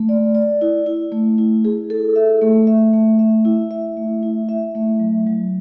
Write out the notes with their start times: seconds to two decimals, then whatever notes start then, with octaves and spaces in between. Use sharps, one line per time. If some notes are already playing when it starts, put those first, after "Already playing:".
Already playing: A3
0.09 D5
0.35 D5
0.61 E4
0.86 E4
1.12 A3
1.38 E4
1.65 G#4
1.90 A4
2.16 E5
2.41 A3
2.67 E5
2.93 A3
3.19 E5
3.45 E4
3.71 E5
3.97 A3
4.23 E4
4.49 E5
4.75 A3
5.00 F#3
5.27 F#3